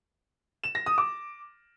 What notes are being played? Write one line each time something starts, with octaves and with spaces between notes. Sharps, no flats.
E7
A#6
D#6
D6